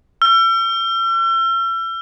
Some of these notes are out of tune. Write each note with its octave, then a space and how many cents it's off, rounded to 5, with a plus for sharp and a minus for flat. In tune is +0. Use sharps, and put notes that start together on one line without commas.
E6 +40